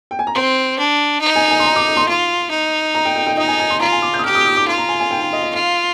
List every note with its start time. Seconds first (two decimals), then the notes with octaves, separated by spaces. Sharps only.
0.11 G5
0.19 G#5
0.27 A#5
0.34 C4 C6
0.78 D4
1.21 D#4
1.36 G#5
1.51 G#5
1.59 C6
1.65 A#5
1.76 D6
1.97 C6
2.08 F4
2.50 D#4
2.95 A#5
3.05 G5
3.16 G5
3.27 G5
3.37 D#4 D#5
3.48 G#5
3.59 G#5
3.70 C6
3.80 F4 A#5
3.92 G#5
4.02 D6
4.14 G6
4.19 D#6
4.24 G4 F6
4.35 D#6
4.46 D#6
4.57 D6
4.68 F4 C6
4.78 A#5
4.89 G#5
5.00 G#5
5.11 G5
5.21 G5
5.33 D#5
5.43 D#5
5.54 F4 F5